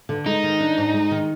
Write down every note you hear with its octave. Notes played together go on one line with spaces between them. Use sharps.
D3
G#3 D#4
D#3
D4
G#2
G#3
D#3